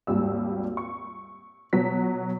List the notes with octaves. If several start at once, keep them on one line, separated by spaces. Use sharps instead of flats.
G#1 D#2 G3 E6
C#6
B2 F#3 B6